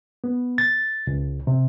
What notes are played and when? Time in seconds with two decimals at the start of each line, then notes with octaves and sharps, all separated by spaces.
0.24 B3
0.58 A6
1.07 C#2
1.47 C3